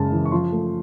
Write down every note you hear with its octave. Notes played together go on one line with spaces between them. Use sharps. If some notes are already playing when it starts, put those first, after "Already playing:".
Already playing: F#2 C#3 G#3 A5
E3
C#6
F3 C6
A3